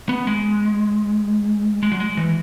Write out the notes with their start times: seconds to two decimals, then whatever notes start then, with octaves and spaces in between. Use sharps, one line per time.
0.09 B3
0.27 G#3
1.83 G#3
1.92 F#3
2.00 G#3
2.17 E3